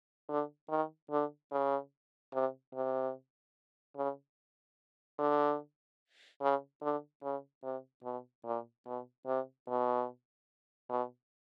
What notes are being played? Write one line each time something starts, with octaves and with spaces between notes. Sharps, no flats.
D3
D#3
D3
C#3
C3
C3
C#3
D3
C#3
D3
C#3
C3
B2
A#2
B2
C3
B2
B2